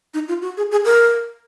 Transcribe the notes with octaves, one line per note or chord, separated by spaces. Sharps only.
D#4
F4
F#4
G#4
G#4
A#4